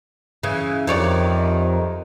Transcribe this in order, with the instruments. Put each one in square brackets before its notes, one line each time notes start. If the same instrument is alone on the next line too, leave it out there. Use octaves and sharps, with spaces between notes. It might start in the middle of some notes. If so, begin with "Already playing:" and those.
[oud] C#3 E3
[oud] F2 C#5 D5 [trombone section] C3 D#3